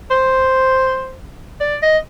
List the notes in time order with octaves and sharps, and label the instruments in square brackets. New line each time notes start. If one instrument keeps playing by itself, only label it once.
[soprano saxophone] C5
D5
D#5